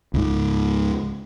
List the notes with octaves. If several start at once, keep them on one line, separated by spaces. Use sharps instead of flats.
C#2 G#2